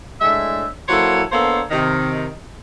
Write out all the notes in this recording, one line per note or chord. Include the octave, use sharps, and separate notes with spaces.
A2 G#3 D4 E5
F#3 A#3 E4 A4 C5 C#5
A#3 B3 D4 A4 C5 C#5
C3 D#3